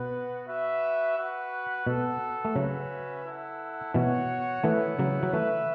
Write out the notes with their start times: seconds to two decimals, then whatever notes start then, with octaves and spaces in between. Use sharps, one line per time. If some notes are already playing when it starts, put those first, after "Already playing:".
Already playing: B2 B3 F#4 B4
0.48 F#4 B4 E5
1.17 F#4 B4 F#5
1.86 B2 B3 A4 F#5
2.45 A3
2.56 C#3 F#3 C#4 F#4 B4 E5
3.25 E4 A4 F#5
3.94 B2 E3 F#4 C#5 F#5
4.64 E3 A3 B3 E4 C#5 F#5
4.99 C#3 F#3
5.23 F#3
5.33 E3 A3 F#4 B4 E5